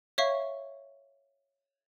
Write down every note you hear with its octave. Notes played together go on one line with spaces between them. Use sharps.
C#5 E5 F5 C#6